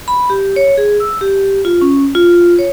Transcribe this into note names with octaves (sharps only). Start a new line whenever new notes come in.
B5
G4
C#5
G#4
E6
G4
F4
C#4
F4
C#5